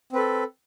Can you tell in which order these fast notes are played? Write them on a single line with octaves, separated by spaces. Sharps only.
C4 B4 A4